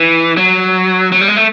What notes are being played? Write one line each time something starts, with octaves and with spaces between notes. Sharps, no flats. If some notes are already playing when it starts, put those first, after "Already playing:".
Already playing: E3
F#3
F#3
G3
G#3
A3